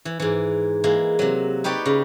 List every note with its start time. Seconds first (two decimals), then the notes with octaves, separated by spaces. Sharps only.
0.05 E3
0.20 G#2 E3
0.84 E3 G#3 A#3
1.19 C3 F#3
1.64 D#4 G4 B4 C#5 D5
1.86 C#3